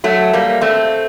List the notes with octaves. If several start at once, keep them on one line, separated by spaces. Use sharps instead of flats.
F#3 A3
G3 A#3
A3 C4